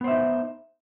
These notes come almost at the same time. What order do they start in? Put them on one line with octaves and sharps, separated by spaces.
B3 C5 E5 D#4